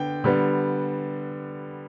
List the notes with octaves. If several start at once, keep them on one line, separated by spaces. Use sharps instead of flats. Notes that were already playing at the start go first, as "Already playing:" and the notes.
Already playing: D3 B3 G5
D3 G3 B3